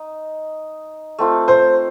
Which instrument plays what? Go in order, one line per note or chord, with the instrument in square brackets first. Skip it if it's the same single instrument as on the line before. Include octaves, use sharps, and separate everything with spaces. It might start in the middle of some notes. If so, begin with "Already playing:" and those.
Already playing: [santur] D#4
A3 C4 F4
[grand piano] C5